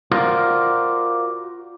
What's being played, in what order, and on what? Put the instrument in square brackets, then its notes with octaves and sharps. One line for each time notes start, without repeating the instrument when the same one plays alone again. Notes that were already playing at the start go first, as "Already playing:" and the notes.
[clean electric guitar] F4 F#4 A#4 C5 D5 F5